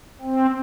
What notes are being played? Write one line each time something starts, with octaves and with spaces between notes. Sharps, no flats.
C4